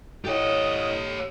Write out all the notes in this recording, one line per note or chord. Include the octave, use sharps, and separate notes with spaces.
A2 G4 A4 C#5 D#5 G5